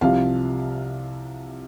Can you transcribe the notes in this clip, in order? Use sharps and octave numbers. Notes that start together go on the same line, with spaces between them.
C2 C3 F3 F5